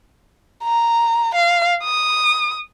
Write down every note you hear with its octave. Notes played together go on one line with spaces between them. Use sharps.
A#5
F5
D#6